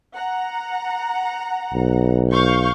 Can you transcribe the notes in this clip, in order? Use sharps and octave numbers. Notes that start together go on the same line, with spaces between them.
F#5 A#5
B1
F5 C#6 G6